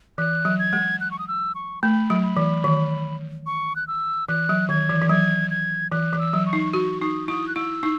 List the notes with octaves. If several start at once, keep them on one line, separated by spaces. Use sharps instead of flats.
E3 F#6
F#3
G#6
G#3
F#6
C#6
D#6
E6
C#6
A3 B5
F#3
B5
E3
D#3
C#6
F#6
E6
E3 F#6
F#3
D#3 G#6
E3
E3
F#3 G#6
G#6
E3 F#6
E3
E6
F#3
C#6
D#4
F#4 C#6
D#4 D#6
E4 D#6
F#6
E4 E6
D#4